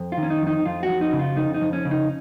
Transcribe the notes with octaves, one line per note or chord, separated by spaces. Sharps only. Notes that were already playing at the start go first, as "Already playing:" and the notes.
Already playing: F2
F4
D#3
C#4
D#4
F2 D#4
F2 F4
F#4
F2
D#4
C#3
F4
F2 D#4
D#4
F2
C#4
C#3
D#4